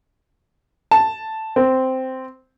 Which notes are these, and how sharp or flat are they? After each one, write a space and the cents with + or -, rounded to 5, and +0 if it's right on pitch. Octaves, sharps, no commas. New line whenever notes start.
A5 +0
C4 -5